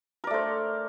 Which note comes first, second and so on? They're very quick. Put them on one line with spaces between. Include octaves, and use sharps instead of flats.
A#4 D5 A3 C5